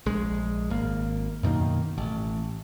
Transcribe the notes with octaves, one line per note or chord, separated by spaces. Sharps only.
A#1 G#3
G#1 A#3
F#2 B2 D#3 A#3
A1